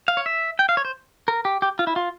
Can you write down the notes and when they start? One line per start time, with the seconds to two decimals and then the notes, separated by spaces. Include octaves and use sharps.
0.08 F5
0.17 C#5
0.26 E5
0.59 G5
0.69 F5
0.77 C#5
0.85 C5
1.28 A#4
1.45 G4
1.62 G4
1.79 F4
1.87 E4
1.96 F4